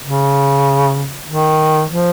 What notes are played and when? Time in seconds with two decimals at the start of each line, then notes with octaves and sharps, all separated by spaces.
0.02 C#3
1.27 D#3
1.91 F3